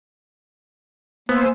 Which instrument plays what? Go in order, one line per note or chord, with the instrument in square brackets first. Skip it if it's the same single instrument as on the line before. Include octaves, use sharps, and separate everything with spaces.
[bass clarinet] A#3 [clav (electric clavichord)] B3 [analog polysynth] C5 G#5 E6